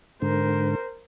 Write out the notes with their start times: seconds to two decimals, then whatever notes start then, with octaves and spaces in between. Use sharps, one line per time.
0.22 G#2 D3 A#4 C5